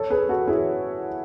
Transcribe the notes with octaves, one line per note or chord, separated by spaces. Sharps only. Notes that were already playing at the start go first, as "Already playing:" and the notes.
Already playing: A4 C#5
G#4 B4
F#4 A4
E4 G#4